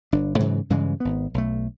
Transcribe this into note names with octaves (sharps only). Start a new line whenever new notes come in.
G1 D4
G#2 C#3 E3 F#3
G2 C#3 E3 G#3
G#1 B3
B1 A3